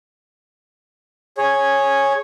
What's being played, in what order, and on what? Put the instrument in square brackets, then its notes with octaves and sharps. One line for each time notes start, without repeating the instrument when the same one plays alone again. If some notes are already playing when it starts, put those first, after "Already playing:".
[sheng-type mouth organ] G#4 C#5